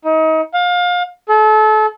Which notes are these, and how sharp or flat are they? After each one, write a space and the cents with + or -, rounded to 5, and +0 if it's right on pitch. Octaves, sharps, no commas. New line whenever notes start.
D#4 +30
F5 +25
A4 -35